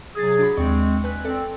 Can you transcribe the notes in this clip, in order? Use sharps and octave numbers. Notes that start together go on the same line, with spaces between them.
C3 F#3 G#4 D#6 A6
D4 F#4 B5
D#2 G#3 C4 D5 C#6
B4 G#5 F#6
C4 A4 D5